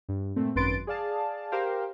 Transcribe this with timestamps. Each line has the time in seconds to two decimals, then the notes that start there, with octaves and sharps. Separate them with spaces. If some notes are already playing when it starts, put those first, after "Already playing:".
0.09 G2
0.36 A#2 A3 C4
0.55 G#1 F#2 B4 C6 A6 D7
0.87 G#4 D5 F5 A5
1.52 G4 A#4 C5 F5 G5